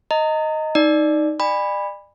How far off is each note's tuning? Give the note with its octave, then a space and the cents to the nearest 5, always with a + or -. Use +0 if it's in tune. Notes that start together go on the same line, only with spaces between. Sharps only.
D#5 +5 A#5 -35
D#4 +0 D5 +0
D5 +35 G#5 -40 B5 +0